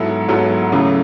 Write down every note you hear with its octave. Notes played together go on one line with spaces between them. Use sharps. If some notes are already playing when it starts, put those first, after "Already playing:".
Already playing: G#2 F#3 B3 E4 A4
G#2 F#3 B3 E4 A4
F#2 C#3 E3 A3